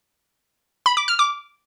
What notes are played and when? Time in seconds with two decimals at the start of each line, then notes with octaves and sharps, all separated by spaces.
0.86 B5
0.97 D6
1.08 F6
1.19 D6